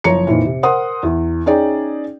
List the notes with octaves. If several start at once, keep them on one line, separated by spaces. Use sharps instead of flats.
F#1 F3 C#5 A#5 C#7
F2 A#2 D#3 E3
C3
A#4 C5 F#5 C6 D#6
E2
C#4 D#4 G#4 D5 G5